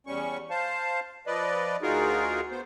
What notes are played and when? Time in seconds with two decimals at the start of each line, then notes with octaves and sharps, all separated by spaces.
0.07 E2 G3 C#4 C#6
0.50 C5 F5 A5
1.27 F3 B4 D5 D#5
1.82 D2 D#4 F4 F#4 G#4 A#4
2.51 B3 C5